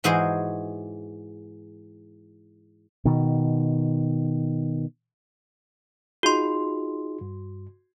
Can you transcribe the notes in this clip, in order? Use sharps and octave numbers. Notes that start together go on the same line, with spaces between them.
G#2 E3 F#4 G#4 C5 D#5
B2 D#3
D#4 F4 F#4 G#4 C6
G2